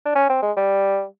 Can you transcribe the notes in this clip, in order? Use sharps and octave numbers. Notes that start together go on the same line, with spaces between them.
D4
C#4
C4
G#3
G3